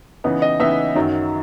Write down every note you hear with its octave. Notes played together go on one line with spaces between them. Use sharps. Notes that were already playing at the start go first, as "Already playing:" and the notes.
C#3 E3 B3 D#4
D#5
C#3 E3 B3 D#4 E5
F#2 D#3 F#3